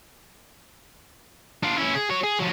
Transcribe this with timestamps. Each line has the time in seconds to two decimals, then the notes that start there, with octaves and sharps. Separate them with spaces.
1.63 D4 F4
1.77 C#4 E4
1.95 G#4
2.09 F#4 C#5
2.23 G#4
2.39 F3 F#3